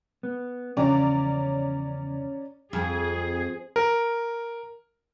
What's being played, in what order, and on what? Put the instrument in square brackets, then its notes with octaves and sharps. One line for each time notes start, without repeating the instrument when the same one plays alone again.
[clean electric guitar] B3
[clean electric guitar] E2 C#3 F3 [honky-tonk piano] C#4 D5 A#5
[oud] F2 [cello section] G#4
[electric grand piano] A#4